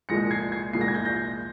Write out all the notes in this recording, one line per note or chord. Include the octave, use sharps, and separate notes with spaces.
C2 A#2 F3 G#3 A#6 C#7
G#6 C7
G#6 C7
C2 A#2 F3 G#3 C7
A#6
G#6
G6 A#6
G6 A#6